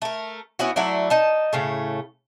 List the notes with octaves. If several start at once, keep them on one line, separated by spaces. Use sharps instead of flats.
A3 A#4
B3 C#4 E4 F#4
F#3 A3 E4 D5
D#4 A5
A2 C#3 A3